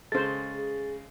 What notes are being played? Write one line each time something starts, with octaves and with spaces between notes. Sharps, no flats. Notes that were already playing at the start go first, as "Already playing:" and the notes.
C#3 G#3 A4 C5 A6
G#4